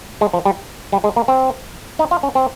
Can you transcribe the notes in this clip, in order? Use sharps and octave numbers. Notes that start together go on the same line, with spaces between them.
G#3
F3
G3
G3
G#3
A#3
C4
D#4
F4
C#4
C4